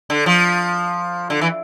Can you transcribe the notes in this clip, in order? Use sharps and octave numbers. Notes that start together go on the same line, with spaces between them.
D3
F3
D3
E3